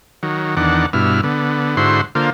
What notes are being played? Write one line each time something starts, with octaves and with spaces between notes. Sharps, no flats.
D#3 F#3
E2 D#3 D4 F#5
G2 B2 E4 F6
D3 B3
G#2 D3 E4 F#4 C5 C6
D3 A#3 F4 C5